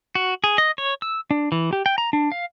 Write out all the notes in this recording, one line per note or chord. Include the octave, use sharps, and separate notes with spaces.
F#4
G#4
D#5
C#5
E6
D4
E3
G4
G5
A#5
D4
F5